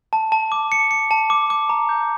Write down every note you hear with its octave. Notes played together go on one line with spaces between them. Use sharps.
A5
A5
D6
C#7
C#7
A5
D6
D6
A#5
G6